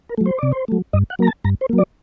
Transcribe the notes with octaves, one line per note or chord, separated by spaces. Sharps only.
A#4
F#3 A3
C5
C3 D5
C5
F#3 A3
G2 D#5
F#5
F#3 A#3 A#5
A5
G2 A#5
C5
F#3 A#3
D5